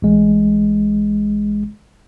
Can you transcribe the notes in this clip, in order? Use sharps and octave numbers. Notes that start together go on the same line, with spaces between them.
A1 G#3